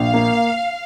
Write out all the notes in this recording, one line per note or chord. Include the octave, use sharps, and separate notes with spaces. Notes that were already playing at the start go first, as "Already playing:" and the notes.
Already playing: A#1 F5
A#3